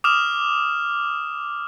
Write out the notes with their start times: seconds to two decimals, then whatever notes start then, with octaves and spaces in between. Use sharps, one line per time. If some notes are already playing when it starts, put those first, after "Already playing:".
0.04 D6 D#6 F6 E7